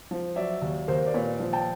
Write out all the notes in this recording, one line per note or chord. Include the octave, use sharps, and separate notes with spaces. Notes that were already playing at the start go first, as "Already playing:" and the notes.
F3
F#3 D5 E5
D#2
D#2 A#4 C5
D5
A#2 B4 C#5
F3
G5 A5